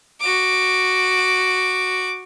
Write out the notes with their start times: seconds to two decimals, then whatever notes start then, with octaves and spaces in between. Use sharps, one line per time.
0.21 F#4 D6